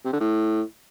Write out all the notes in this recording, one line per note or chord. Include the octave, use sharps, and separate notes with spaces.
C3
D3
A2